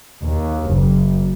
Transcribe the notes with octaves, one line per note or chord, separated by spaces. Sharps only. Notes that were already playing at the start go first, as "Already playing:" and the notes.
D#2
F#1